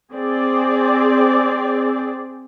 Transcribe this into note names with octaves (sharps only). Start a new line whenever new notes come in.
C4 G#4 D5